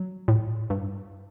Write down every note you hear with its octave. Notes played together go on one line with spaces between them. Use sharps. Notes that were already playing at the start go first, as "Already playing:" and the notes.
Already playing: F#3
A2
G2